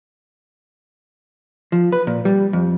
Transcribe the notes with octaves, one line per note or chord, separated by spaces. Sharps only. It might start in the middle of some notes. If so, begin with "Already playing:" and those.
F3
B4
A#2
G3
F2